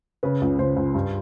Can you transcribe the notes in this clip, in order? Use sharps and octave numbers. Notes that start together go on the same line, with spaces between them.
C#3 B4
C#2
C#2 C5
C#2
G2